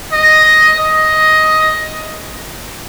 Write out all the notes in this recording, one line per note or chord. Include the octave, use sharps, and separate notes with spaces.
D#5
D#5